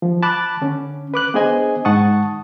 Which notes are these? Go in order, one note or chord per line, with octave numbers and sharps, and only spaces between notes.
F3
A5 B5 D6 F#6
D3 C#4
B4 D6 F#6
B3 D4 G#4 C5 D#5 G#5
G#2 F#5 A5 C#6 D#6